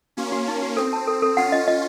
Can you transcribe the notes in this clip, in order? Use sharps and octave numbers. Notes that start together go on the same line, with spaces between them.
A#3 C#4 F#4
F#4
A#3 D#4
F#4
C4 A4
A5
A4
A4
C#4 F4 F#5
D#5
D#5